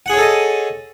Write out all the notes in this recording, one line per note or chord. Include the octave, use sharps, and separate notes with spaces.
G#4 A4 C#5 D#5 F#5